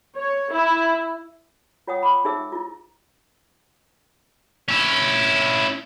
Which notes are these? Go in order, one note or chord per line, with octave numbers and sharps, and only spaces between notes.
C#5
E4
F4 C#5 F#5 G5 D#6
B5 D6
D#4 G#4 C5 E5 E6
E4 F4
C#4 E4